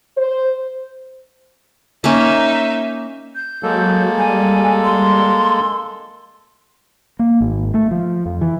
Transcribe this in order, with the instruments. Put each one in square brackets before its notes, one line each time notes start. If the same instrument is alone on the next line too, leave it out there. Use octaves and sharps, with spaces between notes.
[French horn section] C5
[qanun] A#3 C#4 [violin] D#4 E5
[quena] G6
[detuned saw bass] F#3 [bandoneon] G#3 A#3 A4
[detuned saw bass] G3 [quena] G#5
[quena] C6
[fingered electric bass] A#3
G#1
A3
F3
F2
E3